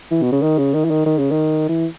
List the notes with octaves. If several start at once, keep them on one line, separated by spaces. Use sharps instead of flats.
E3
B2
C#3
D#3
C#3
D#3
E3
D#3
D#3
C#3
D#3
E3